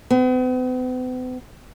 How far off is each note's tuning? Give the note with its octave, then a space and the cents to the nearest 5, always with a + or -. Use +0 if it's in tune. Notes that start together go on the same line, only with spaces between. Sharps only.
B3 +45